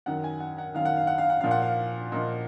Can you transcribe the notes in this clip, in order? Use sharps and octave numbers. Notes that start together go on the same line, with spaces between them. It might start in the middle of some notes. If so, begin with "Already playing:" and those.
F#2 D#3 F#5
G#5
F#5
F#5
F#2 D#3 F5
F#5
F5
F#5
F5
F#5
A#2 F3 F5
F#5
F5
A#2 F3 D#5